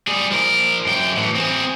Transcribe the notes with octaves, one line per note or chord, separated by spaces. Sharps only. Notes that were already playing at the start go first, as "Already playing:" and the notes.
G3 G#4
F3 A#4
F#2 G5
A2 E3
C4 G#4